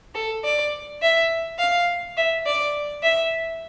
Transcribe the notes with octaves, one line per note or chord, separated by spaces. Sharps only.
A4
D5
E5
F5
E5
D5
E5